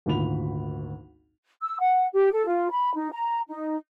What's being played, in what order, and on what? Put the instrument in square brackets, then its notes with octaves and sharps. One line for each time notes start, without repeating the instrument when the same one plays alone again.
[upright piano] G#1 D2 A#2 B5 F7
[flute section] E6
F#5
G4
A4
F4
B5
D#4
A#5
D#4